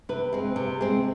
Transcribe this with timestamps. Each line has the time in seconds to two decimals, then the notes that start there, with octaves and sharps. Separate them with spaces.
0.09 C3 B4
0.33 G#3 C4
0.56 C3
0.81 G#3 C4